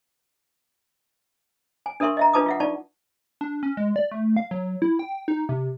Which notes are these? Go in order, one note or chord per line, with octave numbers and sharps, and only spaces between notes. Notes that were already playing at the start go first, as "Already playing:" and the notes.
G#5
D4 A4 A#4 E5 C6 C#6
D#5 E5 A#5
D4 F4 B4 A5 D6 D#6
F4 E5 F#5
D#4 F4 D5 A5 C#6
D4
C#4
G#3
D5
A3
F5
F#3
E4
G5
D#4
C3